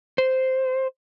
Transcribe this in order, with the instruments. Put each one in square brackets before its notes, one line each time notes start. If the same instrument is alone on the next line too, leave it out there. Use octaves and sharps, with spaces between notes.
[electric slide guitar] C5